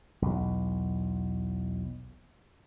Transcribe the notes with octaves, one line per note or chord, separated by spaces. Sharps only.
B1 E2